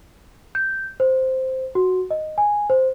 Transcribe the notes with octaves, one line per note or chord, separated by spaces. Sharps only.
G6
C5
F#4
D#5
G#5
C5